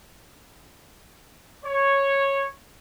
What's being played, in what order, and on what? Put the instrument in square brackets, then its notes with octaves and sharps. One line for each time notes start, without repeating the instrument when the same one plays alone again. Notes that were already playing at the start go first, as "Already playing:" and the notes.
[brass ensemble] C#5